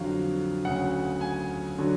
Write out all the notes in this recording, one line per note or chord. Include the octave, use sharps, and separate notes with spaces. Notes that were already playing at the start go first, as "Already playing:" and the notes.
Already playing: F2 D3 F#3 F5
D2 C#3 F#3 F#5
G#5
D3 F#3